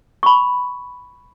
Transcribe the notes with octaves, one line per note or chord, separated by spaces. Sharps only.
B5 C#6